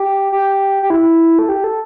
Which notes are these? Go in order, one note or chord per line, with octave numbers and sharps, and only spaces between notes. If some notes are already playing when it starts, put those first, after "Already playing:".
Already playing: G4
G4
G4
E4
A4
G4
A4